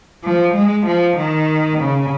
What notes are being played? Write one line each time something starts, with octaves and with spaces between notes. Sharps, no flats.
F3
G#3
F3
D#3
C#3